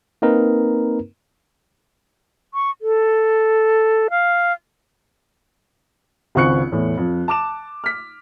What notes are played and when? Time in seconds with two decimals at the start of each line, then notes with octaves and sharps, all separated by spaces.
0.22 A#3 C4 D#4 A#4 B4
2.54 C#6
2.81 A4
4.10 F5
6.35 G#1 C#2 C4 C#6 F#6 C#7
6.72 E2 A2
6.97 F2
7.28 A5 D6 E7
7.84 F6 B6